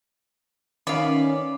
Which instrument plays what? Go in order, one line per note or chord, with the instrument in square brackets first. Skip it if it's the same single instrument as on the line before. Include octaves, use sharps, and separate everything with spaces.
[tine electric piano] D#3 [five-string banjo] B3 F5 [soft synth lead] C#4 [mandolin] D5 B5